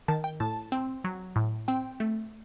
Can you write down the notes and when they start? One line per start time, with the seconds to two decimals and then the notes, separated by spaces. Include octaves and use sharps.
0.08 D#3 A5
0.24 G5
0.40 A2 A5
0.72 C4
1.04 F#3
1.36 A2
1.68 C4 G5
2.00 A3